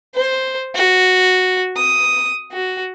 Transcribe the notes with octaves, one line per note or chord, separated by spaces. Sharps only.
C5
F#4
D#6
F#4